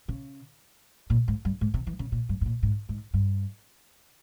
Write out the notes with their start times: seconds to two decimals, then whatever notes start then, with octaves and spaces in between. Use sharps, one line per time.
0.08 C#3
1.10 A#2
1.28 G#2
1.45 G2
1.61 G#2
1.74 C3
1.87 E3
1.99 C#3
2.12 A#2
2.29 G2
2.41 G#2
2.46 A#2
2.63 G#2
2.89 G#2
3.14 G2